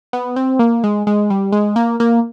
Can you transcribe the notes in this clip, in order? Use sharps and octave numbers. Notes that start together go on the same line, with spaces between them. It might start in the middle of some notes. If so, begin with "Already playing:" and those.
B3
C4
A#3
G#3
G#3
G3
G#3
A#3
A#3